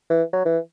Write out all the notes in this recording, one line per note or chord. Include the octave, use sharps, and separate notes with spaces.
E3
F#3
E3